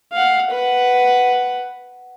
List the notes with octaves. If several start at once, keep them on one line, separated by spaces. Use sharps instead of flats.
F5 F#5
B4 F#5